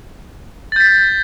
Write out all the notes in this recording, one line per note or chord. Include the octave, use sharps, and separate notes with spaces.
G6 A6 B6